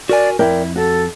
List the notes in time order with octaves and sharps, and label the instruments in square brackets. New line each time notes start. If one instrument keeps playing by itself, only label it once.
[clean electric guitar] F#4 A#4 G#5 [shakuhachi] D5
[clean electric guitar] F2 [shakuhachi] E4 [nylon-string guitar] A#4 D5 G5
[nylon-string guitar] F#4 [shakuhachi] A4